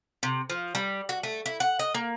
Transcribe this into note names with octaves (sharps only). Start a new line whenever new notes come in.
C3
F3
G3
F#4
A3
E4
F#5
D#5
A#3